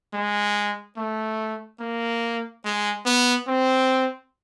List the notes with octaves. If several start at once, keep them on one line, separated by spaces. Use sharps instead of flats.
G#3
A3
A#3
G#3
B3
C4